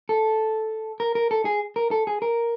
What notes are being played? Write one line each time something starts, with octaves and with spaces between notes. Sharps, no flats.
A4
A#4
A#4
A4
G#4
A#4
A4
G#4
A#4